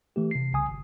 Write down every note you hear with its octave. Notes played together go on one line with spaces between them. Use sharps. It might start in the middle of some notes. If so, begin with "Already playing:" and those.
E3 A3 G4
C3 C7
C2 C#3 G#5 D#6
G1